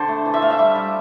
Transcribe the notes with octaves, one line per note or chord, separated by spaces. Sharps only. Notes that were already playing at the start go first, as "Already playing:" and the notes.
Already playing: D3 C5
A3
E3
E5
A3 F5
E5
G3
G3